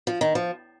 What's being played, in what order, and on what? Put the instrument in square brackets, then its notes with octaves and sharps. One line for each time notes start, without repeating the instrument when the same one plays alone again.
[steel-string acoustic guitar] F3
D#3
F3